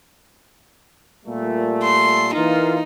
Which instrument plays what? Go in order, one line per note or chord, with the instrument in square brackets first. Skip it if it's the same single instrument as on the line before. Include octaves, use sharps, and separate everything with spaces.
[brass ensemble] A#2 G3 A3
[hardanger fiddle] C6
[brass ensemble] E3 A#3 F4 [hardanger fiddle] D#4